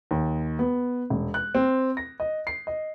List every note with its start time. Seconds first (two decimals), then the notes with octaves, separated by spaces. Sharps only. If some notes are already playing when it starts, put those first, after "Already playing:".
0.11 D#2
0.59 B3
1.10 E1
1.34 F#6
1.55 C4
1.97 A#6
2.20 D#5
2.47 C7
2.67 D#5